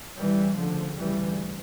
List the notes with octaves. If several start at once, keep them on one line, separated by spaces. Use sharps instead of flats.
D2 C#3 E3 G3
D3 F3
E3 G3